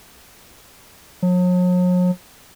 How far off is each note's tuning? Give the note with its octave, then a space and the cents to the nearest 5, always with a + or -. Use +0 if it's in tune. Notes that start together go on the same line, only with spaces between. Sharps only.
F#3 -45